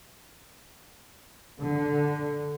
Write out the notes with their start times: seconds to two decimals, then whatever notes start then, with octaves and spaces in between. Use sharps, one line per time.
1.60 D3